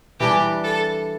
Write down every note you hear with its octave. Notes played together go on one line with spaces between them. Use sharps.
E3 G3 D4 G4
A4